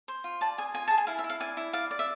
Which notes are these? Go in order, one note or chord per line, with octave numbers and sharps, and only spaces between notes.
C5
F4
D5 A5
G#4 G#5
F4 G#5
G#4 A5
G#5
E4 F5
E5
E4
F5
D5 G#5
E4
D5 F5
D5
E5